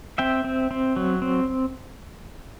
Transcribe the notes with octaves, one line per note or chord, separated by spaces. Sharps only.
C4 E5 G5
C4
C4
F#3
C4